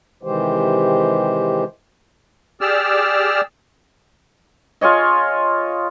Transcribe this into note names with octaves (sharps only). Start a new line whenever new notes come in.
C3 D#3 E3 G#3 G4 C5
G4 G#4 D5 E6 F6
F4 G#4 C#5 D#5